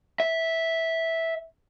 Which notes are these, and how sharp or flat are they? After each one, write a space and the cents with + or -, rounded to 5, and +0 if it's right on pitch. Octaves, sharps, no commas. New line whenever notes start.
E5 -10